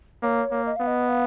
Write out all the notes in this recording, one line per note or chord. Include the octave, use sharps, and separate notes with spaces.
A#3 C#5
A#3
D#5
B3 F5
D#5
F5